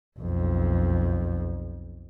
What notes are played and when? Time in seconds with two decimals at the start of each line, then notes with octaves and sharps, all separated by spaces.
0.19 B1 F2